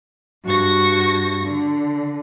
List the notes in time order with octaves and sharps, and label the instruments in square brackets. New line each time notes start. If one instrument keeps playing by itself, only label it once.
[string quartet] G2 F#4 C#6 A#6
D3